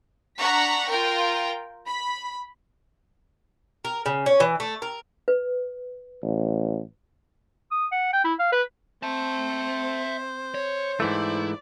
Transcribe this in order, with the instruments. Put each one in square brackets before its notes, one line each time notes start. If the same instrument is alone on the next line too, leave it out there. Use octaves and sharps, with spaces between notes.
[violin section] D4 F#5 A#5 C#6 B6
F4 A#4 G5
B5
[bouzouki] A#4
C#3
C#4
E3
A3
A#4
[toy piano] B4
[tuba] A1
[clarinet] D#6
F#5
G5
E4
F5
B4
[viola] C4 [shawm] C5 [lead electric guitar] E5 A5
[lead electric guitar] C#5
[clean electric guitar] G#2 E3 A3 [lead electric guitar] E4 [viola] D5